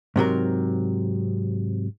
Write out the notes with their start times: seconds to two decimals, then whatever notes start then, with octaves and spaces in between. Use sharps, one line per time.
0.16 G#2 C3 F#3 A#4